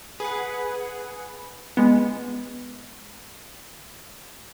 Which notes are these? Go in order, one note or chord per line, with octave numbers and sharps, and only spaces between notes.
G#4 B4 F#5
G#3 B3